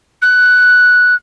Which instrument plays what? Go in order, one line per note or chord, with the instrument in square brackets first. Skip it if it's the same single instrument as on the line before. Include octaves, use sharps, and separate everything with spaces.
[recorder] F#6